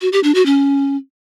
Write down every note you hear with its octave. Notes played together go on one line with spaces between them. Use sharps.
F#4
G4
D4
F#4
C#4